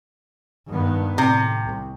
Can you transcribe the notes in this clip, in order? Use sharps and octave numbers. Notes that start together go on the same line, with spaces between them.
G2 D#3 B3
A2 C3
C2